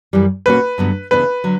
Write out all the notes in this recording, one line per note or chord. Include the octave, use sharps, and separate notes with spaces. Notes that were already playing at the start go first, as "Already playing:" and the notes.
F#2 E3 G3
B2 A#3 C#4 F#4 B4
G2 D3 F#3 B3
C#3 E3 B3 D4 B4
D3 F#3